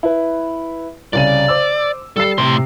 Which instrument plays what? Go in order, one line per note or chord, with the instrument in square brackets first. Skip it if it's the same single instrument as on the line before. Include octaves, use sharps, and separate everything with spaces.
[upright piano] E4 B4
[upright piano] C2 C#3 D#7 [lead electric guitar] D5
[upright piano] C5 D6 E6
[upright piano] G3 E6 C7 [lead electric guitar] A4
[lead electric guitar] A2 C6 [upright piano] C3